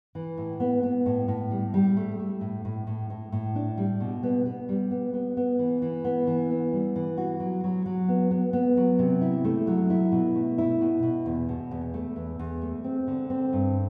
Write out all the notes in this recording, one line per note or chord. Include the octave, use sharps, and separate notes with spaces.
E3
A2
B3
B3
A2
A2
G3
G3
A3
A3
A2
A2
A2
A2
A2
D4
G3
B2
B3
B3
G3
B3
B3
B3
E3
E3
B3
E3
B3
G3
E3
F#4
F#3
F#3
F#3
B3
B3
B3
F#3
C3
E4
A3
F#3
E4
B2
A3
E4
B2
B2
E2
B2
E2
A3
E2
E2
A3
C4
D3
C4
G2